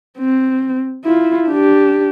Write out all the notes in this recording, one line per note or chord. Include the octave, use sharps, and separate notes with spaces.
C4
E4 F4
D4 G4